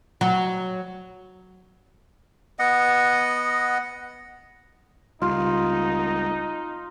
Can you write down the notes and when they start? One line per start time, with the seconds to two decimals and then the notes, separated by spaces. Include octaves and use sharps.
0.21 F#3
2.59 B3 D#5 F#5
5.22 C#2 G3 D#4 F4